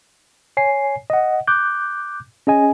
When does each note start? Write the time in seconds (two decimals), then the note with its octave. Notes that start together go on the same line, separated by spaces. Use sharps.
0.57 C#5 G#5 C7
1.10 D#5 F#5
1.47 D6 F#6 G6
2.47 C#4 G#4 D#5 G#5